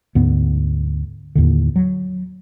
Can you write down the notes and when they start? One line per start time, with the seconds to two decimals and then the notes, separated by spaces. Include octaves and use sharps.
0.15 D2 G#2 B3
1.35 D#2 A2 D3
1.76 F#3